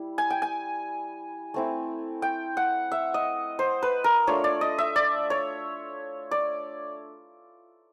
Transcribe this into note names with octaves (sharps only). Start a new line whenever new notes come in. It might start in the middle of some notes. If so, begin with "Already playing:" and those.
Already playing: G3 E4
G#5
G5
G#5
A3 C4 E4
G5
F#5
E5
D#5
C5
B4
A#4
A3 D4 F4 C#5
D5
D#5
E5
D5
C#5
D5